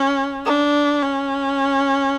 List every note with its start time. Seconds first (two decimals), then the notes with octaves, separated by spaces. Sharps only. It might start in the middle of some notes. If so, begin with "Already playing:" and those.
Already playing: C#4
0.46 D4
1.03 C#4